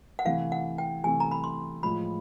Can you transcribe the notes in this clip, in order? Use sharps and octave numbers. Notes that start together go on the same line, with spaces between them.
F#5
C3 E3 A3 F5
F#5
G5
C3 E3 A3 G#5
A#5
B5
C6
A2 F3 G#3 B5